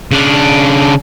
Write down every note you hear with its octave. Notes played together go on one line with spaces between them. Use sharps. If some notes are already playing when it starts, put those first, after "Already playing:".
C#3 D4